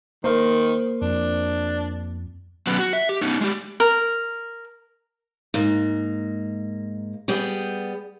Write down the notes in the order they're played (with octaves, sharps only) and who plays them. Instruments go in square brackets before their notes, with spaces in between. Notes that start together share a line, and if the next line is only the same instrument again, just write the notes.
[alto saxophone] D#3 [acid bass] A#3 [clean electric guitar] A#4 C5
[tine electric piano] F2 [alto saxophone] D4
[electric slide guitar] F#3 B3 C#4 B4
F#4
E5
G4
B3 C#4 D#4
G#3 G4
[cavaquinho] A#4
[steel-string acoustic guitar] G#2 A#3
G3 B3 G#4 G5